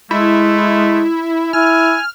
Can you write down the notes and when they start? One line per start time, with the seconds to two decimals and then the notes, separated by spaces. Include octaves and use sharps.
0.11 G#3 A3 E4
1.53 E4 G#5 F6